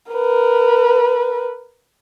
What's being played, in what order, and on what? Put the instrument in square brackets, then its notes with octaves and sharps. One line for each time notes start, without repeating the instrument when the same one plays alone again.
[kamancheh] A#4 B4